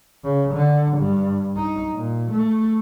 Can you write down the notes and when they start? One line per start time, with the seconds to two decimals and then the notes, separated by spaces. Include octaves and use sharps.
0.24 C#3
0.53 D3
0.98 G2
1.57 D#4
1.94 A#2
2.32 A3